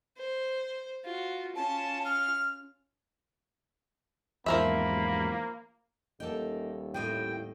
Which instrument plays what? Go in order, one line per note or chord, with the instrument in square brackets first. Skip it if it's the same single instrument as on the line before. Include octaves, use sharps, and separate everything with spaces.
[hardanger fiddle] C5
F4 F#4
[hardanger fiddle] C#4 F4 [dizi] A5
[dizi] F6
[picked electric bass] E2 G#2 [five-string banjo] F3 A#4 E5 [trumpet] A#3 [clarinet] B5
[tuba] D#1 [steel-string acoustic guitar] A#3 D#4 [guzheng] A4 G5
[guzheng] A2 D#5 [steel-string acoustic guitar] E4 F4 G4 [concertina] G5